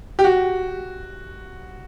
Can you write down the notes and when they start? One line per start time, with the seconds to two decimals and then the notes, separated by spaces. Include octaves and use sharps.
0.19 G4
0.24 F#4